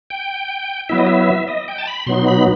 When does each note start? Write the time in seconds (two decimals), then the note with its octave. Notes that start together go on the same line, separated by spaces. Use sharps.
0.10 G5
0.89 F#3 B3 E4 E5
0.98 D#5
1.06 E5
1.48 D#5
1.68 G5
1.78 A5
1.87 B5
2.06 B2 F#3 B3 D#4 C6
2.27 B5